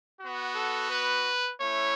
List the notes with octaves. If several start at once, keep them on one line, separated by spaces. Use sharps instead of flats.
B3 F#4
A4
B4
A3 C#4 E4 C#5